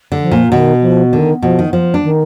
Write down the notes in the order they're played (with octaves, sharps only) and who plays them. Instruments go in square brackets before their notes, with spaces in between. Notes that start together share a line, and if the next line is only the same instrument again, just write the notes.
[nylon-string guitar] D3
[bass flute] F3
[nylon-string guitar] A#2
[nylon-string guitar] B2 [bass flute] D#3
[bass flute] F3
[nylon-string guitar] D3 [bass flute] D#3
[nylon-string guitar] B2 [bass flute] F3
[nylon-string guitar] D#3
F3
D4
[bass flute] D#3